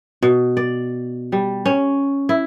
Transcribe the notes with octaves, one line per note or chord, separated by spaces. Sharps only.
B2
D5
G3
C#4
E4